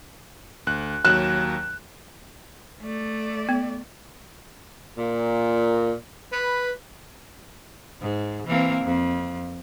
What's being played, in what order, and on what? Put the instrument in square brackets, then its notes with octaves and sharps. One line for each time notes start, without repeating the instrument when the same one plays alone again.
[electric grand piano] D2 F#6
[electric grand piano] D#2 F#3 E7 [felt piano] F#6
[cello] A3 D5
[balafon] B3
[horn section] A#2
B4
[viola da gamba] G#2
E3 A#3 C4
F2